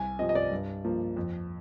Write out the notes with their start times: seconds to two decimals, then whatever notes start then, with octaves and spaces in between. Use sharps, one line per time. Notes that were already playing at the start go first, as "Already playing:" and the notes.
Already playing: C2 G#5
0.19 C3 F3 D#5
0.29 D#5
0.35 D5
0.52 G2
0.84 F3 A#3
1.17 F2